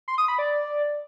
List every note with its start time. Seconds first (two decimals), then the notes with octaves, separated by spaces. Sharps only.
0.08 C6
0.18 D#6
0.28 B5
0.39 D5